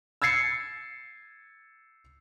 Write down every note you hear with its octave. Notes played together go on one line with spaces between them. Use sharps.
E6 G#6 A6 C7 C#7